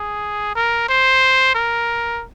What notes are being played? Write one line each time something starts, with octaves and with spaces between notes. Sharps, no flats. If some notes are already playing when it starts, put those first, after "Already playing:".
Already playing: G#4
A#4
C5
A#4